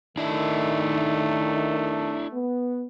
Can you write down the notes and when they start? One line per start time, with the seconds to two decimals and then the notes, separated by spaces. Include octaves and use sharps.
0.17 D#3 A3 D4 E4
2.32 B3